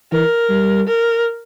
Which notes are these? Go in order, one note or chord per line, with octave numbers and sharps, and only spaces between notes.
E3 A#4
G3
A#4